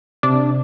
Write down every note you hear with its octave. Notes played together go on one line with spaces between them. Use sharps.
C3 D4